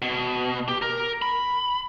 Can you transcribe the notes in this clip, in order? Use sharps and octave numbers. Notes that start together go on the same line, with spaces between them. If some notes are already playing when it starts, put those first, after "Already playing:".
B2
G4
A#4
B5